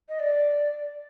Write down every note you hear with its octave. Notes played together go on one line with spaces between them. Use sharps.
D#5
D5